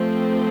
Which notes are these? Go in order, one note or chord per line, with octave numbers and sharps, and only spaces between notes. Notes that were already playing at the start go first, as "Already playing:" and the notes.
Already playing: F3 A3 C4